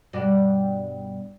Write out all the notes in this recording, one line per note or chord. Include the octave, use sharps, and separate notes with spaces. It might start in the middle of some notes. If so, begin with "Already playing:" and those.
G2 B2 D5